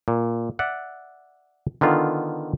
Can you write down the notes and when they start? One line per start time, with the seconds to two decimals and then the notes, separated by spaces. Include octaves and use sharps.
0.08 A#2
0.59 D5 E5 F#5
1.81 D3 D#3 B3 F4